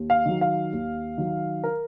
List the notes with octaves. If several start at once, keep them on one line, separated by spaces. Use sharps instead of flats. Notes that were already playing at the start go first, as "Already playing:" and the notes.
Already playing: D#2
F5
D#3 F#3
F5
D#2
D#3 F#3
A#4